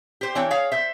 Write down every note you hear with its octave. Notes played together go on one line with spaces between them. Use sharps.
G4 C5
E3 C4 D4 C#5 G5
G#4 C#5 F5
C5 E5